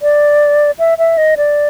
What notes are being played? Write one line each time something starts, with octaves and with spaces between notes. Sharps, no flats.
D5
E5
E5
D#5
D5